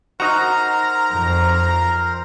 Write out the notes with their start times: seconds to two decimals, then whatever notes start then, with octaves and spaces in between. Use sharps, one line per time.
0.20 D#4 F#4 A#4 C5 A#5
1.14 F2